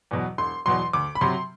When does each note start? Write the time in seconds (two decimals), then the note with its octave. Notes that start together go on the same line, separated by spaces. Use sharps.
0.11 E2 B2 F#3
0.38 E1 C6
0.66 E2 B2 F#3 C6
0.93 D2 D6
1.15 B5
1.21 C3 F#3 C6